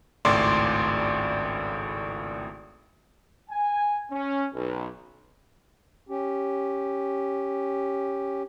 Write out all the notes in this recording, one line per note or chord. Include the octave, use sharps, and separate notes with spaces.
G#1 C#2 A2 D5 C6 D6
G#5
C#4
B1
C#4 G4